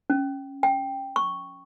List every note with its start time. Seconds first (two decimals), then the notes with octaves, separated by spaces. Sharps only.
0.10 C#4
0.63 G5
1.16 C#6